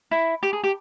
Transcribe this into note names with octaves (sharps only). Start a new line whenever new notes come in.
E4
G4
G#4
G4